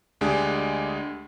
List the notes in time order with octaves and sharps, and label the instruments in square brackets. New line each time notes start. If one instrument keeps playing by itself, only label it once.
[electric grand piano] D2 G#3 D4 G4 G#4